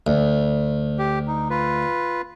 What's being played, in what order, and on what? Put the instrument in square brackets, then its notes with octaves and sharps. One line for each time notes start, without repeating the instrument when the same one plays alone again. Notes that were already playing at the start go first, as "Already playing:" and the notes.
[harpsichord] D2
[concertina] G4
D#4
F4 B4